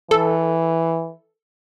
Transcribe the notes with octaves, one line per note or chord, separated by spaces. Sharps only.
E3 A4